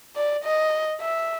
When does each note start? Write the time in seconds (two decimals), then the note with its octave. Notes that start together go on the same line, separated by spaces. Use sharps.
0.16 D5
0.44 D#5
1.01 E5